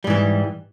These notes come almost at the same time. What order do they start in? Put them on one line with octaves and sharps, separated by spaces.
G3 G#2 E3